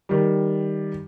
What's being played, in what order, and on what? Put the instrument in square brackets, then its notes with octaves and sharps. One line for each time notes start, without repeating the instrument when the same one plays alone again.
[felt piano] D#3 G3